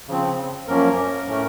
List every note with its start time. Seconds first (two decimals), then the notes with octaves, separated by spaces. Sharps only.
0.08 C#3 F3 C4
0.68 F#2 F3 A#3 C#4 A#4
1.28 A2 A3 C#4